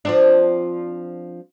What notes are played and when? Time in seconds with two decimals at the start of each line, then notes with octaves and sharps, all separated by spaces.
0.05 F3 C4 D4